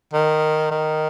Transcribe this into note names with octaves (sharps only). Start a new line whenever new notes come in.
D#3
D#3